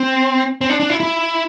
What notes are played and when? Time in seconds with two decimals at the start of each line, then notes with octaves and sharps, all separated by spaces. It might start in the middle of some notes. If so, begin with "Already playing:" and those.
Already playing: C4
0.61 C4
0.70 D4
0.80 D4
0.90 E4
1.00 E4